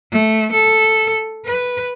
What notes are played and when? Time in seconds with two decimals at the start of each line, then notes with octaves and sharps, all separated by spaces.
0.12 A3
0.53 A4
1.45 B4